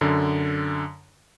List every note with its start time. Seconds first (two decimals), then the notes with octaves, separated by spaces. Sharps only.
0.01 F#2 D3